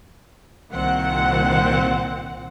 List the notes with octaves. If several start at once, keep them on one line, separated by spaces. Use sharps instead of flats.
C2 A#2 D#3 C4 F#5